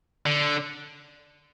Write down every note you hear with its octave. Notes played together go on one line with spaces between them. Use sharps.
D3